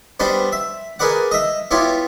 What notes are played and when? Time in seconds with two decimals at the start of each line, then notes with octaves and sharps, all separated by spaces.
0.20 G3 B3 D4 B4 C5
0.52 E5
0.99 G#4 A#4 B4 D5 F#5
1.31 D#5 E5
1.71 B3 E4 F4 G4 C#5